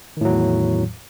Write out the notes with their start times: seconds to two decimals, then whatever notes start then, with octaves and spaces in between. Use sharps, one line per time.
0.17 D#3
0.21 A2
0.25 F#3
0.29 E2